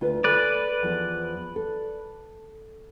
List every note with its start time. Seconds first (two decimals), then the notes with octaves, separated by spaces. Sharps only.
0.01 D2 F4 B4
0.24 A4 B4 D5 G#5
0.83 E2 F3
1.56 A4